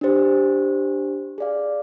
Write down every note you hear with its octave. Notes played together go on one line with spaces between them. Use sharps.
D4 G4 C5
G#4 D5 F5